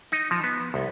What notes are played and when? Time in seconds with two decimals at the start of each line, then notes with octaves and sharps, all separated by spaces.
0.12 D#4
0.31 F3
0.44 B3
0.74 C2